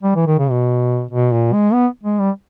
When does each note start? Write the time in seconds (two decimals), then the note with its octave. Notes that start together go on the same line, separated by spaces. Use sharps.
0.03 G3
0.15 E3
0.26 D#3
0.39 C#3
0.50 B2
1.11 B2
1.32 A#2
1.53 G#3
1.73 B3
2.04 G#3
2.19 G3